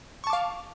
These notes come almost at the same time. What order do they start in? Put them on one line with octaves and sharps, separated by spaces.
C#6 A5 D6 F5